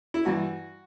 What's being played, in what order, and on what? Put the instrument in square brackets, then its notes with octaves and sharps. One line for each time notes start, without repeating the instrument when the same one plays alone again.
[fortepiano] E4
G2 E3 F#4